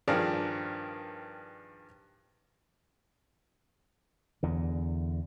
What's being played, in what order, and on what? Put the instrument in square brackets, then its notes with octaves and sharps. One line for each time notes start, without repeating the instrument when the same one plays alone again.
[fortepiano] G2 D#3 F3 D4 G#4 F5
[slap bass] E2 D3